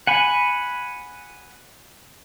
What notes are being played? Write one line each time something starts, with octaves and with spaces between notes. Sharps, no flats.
F#5 G#5 B5